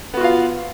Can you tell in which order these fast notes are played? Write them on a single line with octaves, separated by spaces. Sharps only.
B3 F#4 F4 F5